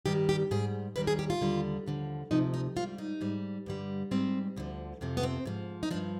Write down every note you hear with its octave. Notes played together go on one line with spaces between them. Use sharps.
G2 D#3 G3 G4
G4
G#2 G3 G#4
D#2 D#3 G3 B4
G#4
G4
F4
D#2 D3 G3
D#2 D3 F3
D2 C3 F3 D#4
D#4
G#2 G3 F4
D#4
G#2 G3
G2 D3 G3
G#2 G3 C4
D2 D3 F3
F2 C3 F3
B3
C4
G#2 F3
D#4
G2 F3 D4